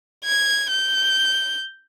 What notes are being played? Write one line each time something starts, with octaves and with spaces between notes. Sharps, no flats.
G#6
G6